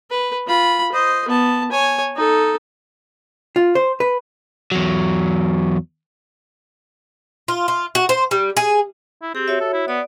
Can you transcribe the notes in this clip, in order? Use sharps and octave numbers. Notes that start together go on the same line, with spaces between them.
B4
F4 B5
C5 D#5
B3 A5
C#5 G#5
D#4 A4
F4
C5
B4
E2 F#3
F4
F4
F#4
C5
G3
G#4
E4
C4 G4 G#4
F#4 C#5 E5
A4
E4
B3 D5